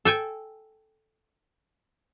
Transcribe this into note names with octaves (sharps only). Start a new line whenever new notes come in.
A4 G5 G#5